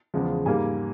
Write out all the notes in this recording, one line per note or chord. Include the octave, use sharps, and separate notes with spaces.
E2 C#3 F3 G#3
G#2 G3 A#3 G#5